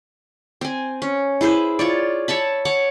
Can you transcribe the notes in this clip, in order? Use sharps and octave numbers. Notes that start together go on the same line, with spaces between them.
C4 G#5
C#4
E4 G#4 B4 C5
F4 C#5 D5
C#5 E5 A5 B5
C#5 F#5 D6